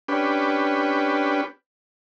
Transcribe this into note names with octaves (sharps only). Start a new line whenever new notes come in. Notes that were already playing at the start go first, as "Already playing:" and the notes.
C#4 D4 G4 B4